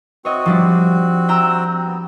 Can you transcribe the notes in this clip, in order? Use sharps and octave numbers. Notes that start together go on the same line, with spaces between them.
C4 F#4 C#5 D#5
F3 G3 D4
G5 A#5 E6
B3